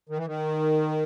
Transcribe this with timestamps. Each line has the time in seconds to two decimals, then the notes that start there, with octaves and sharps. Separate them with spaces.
0.09 D#3
0.17 E3
0.26 D#3